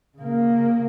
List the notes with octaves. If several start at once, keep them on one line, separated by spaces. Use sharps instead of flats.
C#3 A#3